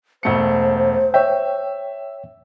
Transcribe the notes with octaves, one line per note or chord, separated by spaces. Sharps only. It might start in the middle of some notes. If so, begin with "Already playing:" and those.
E1 A3 C5 C#7
C#5 E5 G5